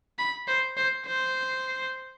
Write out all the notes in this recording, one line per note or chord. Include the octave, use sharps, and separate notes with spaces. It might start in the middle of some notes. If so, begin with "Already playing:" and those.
B5
C5
C5
C5